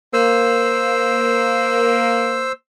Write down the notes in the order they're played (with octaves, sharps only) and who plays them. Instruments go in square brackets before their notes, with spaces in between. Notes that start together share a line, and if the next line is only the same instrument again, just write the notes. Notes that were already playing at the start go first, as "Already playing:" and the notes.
[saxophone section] A#3 [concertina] C5 E6